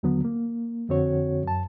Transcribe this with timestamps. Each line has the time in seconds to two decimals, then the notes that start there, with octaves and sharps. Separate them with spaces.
0.03 D#2 D3 F#3 B3
0.25 A#3
0.89 F2 D3 C4 F#4 C#5
1.43 F#2 A5